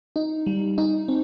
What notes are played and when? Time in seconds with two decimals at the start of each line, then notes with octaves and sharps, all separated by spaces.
0.16 D#4
0.47 G3
0.78 D#4
1.08 C4